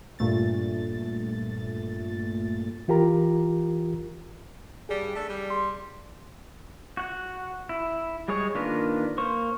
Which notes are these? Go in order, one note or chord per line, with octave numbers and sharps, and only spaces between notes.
G2 A#2 A3 A6
E3 F4 G4 A#4 A#5
G2 G3 G#4
A3 D4 A4
G3
C6
F#4 F#5
E4
G3 G#3 G#4 C#5
D#3 A#3 D4 F4 B4
A#3 C5 C#6